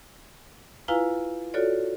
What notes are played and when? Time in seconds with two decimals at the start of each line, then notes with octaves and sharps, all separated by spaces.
0.88 E4 F4 B4 F5 G#5 A#5
1.54 F4 F#4 A4 C#5 D5